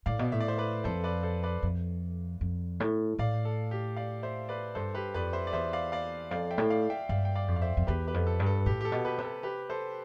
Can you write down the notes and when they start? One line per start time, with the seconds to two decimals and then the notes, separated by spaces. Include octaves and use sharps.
0.06 A2 D5 F5
0.19 B2
0.32 A2 E5
0.40 D5
0.48 C5 E5
0.58 B4 D5
0.84 F2 A4 C5
1.04 B4 D5
1.23 A4 C5
1.43 B4 D5
1.63 F2
2.41 F2
2.80 A2
3.18 A2 D5 F5
3.45 A4
3.71 G4
3.96 D5 F5
4.23 C5 E5
4.49 B4 D5
4.75 G2 A4 C5
4.94 G4 B4
5.14 F2 B4 D5
5.33 C5 E5
5.47 D5
5.53 E2 C5 E5
5.73 D5 F5
5.92 D5 F5
6.31 F2 D5 F5
6.51 E5 G5
6.58 A2
6.70 D5 F5
6.90 E5 G5
7.09 G2 D5 F5
7.25 G5
7.35 D5 F5
7.48 F2
7.56 F5
7.62 C5 E5
7.77 F2
7.87 E2 G4 B4
8.07 G4 B4
8.14 F2
8.27 A4
8.39 G2
8.46 A4
8.66 A2 G4
8.81 G4
8.85 A4
8.92 B2
9.05 G4 B4
9.18 C3
9.25 A4
9.43 G4 B4
9.70 A4 C5